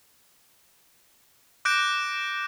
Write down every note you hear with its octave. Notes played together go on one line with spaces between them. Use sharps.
D6 F#6 G6 A#6 D7